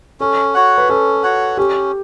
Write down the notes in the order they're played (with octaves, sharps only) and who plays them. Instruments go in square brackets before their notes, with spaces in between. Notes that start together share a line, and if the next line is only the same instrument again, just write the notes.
[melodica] C#4 [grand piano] A4
[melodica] F#4 C#5 F#5
[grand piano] B4
[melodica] C#4 [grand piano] A4
[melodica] F#4 C#5 F#5
[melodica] C#4 [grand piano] G4